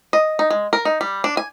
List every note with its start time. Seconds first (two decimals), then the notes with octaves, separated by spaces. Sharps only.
0.13 D#5
0.39 D#4
0.51 G#3
0.73 A#4
0.85 D#4
1.01 G3
1.24 D4
1.37 G#5